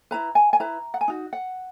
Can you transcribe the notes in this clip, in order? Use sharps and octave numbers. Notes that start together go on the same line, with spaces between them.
E4 B4 A#5
G#5
G#5
E4 B4 A#5
F#5
G#5
D#4 F#4
F#5